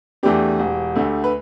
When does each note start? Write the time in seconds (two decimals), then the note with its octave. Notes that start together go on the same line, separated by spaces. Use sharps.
0.23 E2 E3 A3 D4 G4
0.60 E1
0.96 D2 D3 A3
1.24 B4